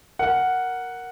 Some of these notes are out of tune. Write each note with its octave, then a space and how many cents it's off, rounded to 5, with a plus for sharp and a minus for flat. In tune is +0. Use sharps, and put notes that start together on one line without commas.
A#4 +0 F#5 +0